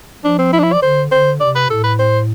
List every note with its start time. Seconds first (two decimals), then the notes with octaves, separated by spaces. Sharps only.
0.24 F3 D4
0.38 C4
0.53 E4
0.59 D4
0.63 E4
0.73 D5
0.82 D3 C5
1.12 D3 C5
1.40 C3 D5
1.55 B4
1.69 A2 A4
1.84 B4
1.99 C5